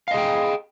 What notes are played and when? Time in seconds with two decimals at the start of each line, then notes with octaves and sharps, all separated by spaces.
0.08 F5
0.11 D#5
0.14 G#4
0.17 G5